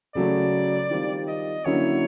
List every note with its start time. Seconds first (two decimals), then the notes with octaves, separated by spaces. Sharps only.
0.15 C#3 F#3 A3 D5
0.91 D#3 G3 C4 F4
1.28 D#5
1.65 D3 F#3 A#3 C#4 E4 C#5